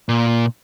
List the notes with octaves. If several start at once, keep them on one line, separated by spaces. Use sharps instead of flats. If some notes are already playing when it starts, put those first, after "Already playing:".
A#2